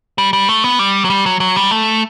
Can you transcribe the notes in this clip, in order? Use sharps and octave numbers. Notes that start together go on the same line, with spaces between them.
G3
G3
A3
B3
G3
F#3
G3
F#3
F#3
G3
A3